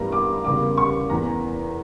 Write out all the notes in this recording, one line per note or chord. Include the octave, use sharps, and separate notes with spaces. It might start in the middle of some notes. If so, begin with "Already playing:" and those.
Already playing: G1 G2 E3 G3 A#3 A#5
D6
E2 C#3 G3 A#3 D6
C#6
E2 E3 A#3 A#5